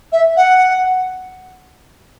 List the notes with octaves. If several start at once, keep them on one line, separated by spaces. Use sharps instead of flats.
E5
F#5